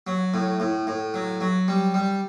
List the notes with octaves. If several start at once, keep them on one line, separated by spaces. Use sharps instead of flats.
F#3
A2
A2
A2
F#3
F#3
G3
G3